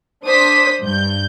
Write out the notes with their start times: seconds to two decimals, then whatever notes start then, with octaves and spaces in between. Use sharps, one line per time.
0.25 D4 C5 D#6 B6
0.82 G2 G6